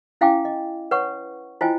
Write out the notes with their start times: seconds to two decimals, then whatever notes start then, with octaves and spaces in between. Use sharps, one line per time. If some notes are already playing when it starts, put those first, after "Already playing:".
0.21 C#4 E4 F5 G5 G#5 D6
0.45 D#5
0.91 B4 C#5 F#5 C#6
1.61 E4 F4 C5 D#5 G5 G#5